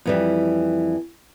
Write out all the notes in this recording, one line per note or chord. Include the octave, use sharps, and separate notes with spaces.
F2 E3 G3